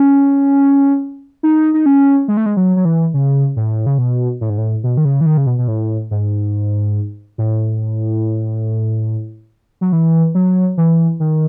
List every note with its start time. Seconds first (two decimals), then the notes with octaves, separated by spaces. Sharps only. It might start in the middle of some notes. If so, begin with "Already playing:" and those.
Already playing: C#4
1.43 D#4
1.74 D#4
1.86 C#4
2.28 G#3
2.37 A3
2.46 G#3
2.57 F#3
2.76 F#3
2.85 E3
3.14 C#3
3.56 A2
3.86 C#3
3.98 B2
4.41 A2
4.50 G#2
4.58 A2
4.84 B2
4.97 D#3
5.05 C#3
5.21 E3
5.26 D#3
5.37 C#3
5.46 B2
5.58 B2
5.68 A2
6.11 G#2
7.38 A2
9.81 F#3
9.92 E3
10.35 F#3
10.77 E3
11.20 D#3